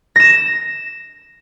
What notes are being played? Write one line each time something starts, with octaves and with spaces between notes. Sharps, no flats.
A#6 E7